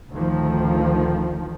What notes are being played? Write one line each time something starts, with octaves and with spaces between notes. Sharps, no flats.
D2 A2 D#3 F3